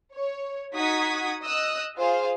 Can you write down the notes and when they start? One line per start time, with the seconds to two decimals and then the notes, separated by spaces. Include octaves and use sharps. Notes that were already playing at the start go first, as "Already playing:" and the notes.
0.14 C#5
0.74 D#4 F#4 F#5 D#6 G#6 B6
1.41 D#5 D#6 E6 F#6
1.96 F4 G#4 C5 F5